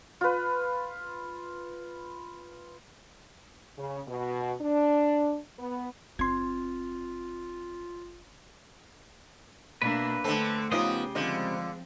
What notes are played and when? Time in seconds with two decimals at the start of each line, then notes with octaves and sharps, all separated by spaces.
0.21 F4 B4
3.78 C#3
4.08 B2
4.61 D4
5.59 B3
6.19 F#1 C4 F4 C6 G#6
9.82 B2 A#3 D4 B4 E5
10.24 D3 A3 C4 A4
10.71 C#3 F3 B3 C#4 D#4 F4 G4 D#6
11.15 D3 F3 G#3 C4 F4 C5 D#5